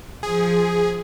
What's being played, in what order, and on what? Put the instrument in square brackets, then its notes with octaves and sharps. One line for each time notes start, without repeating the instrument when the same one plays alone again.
[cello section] F3 [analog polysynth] G#4